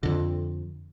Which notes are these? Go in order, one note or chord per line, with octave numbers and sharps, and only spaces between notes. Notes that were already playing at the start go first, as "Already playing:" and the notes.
F2 D3